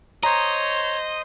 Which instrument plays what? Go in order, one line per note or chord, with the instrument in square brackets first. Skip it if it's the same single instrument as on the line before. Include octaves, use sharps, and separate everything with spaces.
[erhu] C5 [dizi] C#5 [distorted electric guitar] D#5 [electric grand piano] A#5